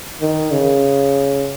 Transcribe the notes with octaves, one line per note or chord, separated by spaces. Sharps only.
D#3
C#3